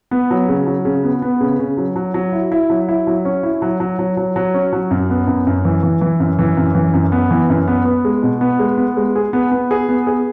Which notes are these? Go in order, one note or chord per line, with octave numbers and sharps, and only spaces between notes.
B3
F#3
C#3
F#3
C#3
B3
B3
C#3
C#3
F#3
F#3
F#3
E4
E4
F#3
E4
F#3
C#4
E4
F#3
F#3
F#3
F#3
F#3
C#4
F#3
F#2
B3
F#2
F#2
E3
E3
E3
F#2
E3
F#2
E3
F#2
B3
E3
F#2
B3
B3
G#3
B2
B3
G#3
B3
G#3
G#4
B3
B3
G#4
B3
G#4